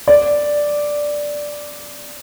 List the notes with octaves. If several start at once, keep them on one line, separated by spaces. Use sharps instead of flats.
D5